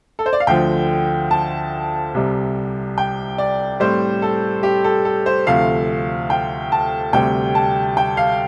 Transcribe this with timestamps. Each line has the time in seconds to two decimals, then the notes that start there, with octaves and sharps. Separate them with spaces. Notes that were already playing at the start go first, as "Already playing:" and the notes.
0.19 A4
0.26 C5
0.33 D5
0.40 F5
0.47 D2 D3 F3 G5
1.31 A5
2.14 C2 C3 G3
2.98 G5
3.38 D5
3.80 A2 G3 C4 C5
4.22 A4
4.63 G4
4.84 A4
5.05 A4
5.26 C5
5.47 D2 C3 F3 A3 F5
6.30 G5
6.72 A5
7.13 D2 C3 G3 G5
7.55 A5
7.97 G5
8.17 F5